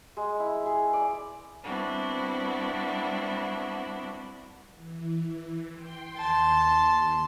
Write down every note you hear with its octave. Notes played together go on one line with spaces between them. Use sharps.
G#3
E4
G#4
D5
G3 B3 C4 D4 E4 F#4
E3
G5 C6
D#2 A5 C6